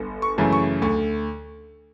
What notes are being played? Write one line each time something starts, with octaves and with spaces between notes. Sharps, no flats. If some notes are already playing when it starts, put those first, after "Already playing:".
Already playing: G1
C#6
F#2 C#3 E3 A3
C#6
D2 C#6